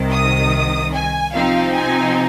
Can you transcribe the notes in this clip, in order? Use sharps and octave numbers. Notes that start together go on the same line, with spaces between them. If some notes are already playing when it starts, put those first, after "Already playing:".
Already playing: C2 C3 D#3
D#6
G#5
C3 F3 C4 D#4 F5
G#5